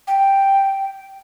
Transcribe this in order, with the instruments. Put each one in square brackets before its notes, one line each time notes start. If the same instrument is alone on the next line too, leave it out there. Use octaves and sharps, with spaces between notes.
[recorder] G5